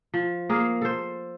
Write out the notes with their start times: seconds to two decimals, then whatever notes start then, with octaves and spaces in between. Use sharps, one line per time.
0.14 F3
0.49 A#3 G#4 F5
0.82 A4 C5